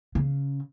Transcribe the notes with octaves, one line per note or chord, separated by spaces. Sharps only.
C#3